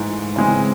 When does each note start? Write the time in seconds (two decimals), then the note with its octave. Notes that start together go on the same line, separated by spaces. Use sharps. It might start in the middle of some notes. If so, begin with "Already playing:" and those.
Already playing: G#2 E3 A3
0.36 C#3 E3 G#3 C4